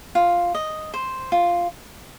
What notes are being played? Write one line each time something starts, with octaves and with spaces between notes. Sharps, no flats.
F4
D#5
C5
F4